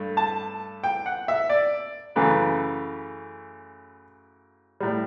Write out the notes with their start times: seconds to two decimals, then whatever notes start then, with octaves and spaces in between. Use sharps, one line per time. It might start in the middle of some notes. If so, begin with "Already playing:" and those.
Already playing: G2 A3
0.17 A5
0.84 G5
1.06 F#5
1.28 E5
1.49 D5
2.16 F#2 C#3 E3 A3 B4
4.80 A2 G3